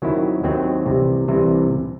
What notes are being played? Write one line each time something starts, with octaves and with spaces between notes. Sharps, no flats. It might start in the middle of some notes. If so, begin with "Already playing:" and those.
D#2 D#3 F#3 C4 E4
D#2 D#3 F#3 C4 E4
C2 C3 E3
C2 C3 E3